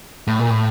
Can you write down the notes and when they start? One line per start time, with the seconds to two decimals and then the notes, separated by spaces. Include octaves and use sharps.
0.27 A2
0.39 A#2
0.50 A2